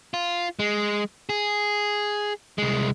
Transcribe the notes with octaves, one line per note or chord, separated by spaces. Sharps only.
F4
G#3
G#4
C2 G#3